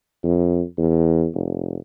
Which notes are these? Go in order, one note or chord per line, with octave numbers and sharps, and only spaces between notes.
F2
E2
F1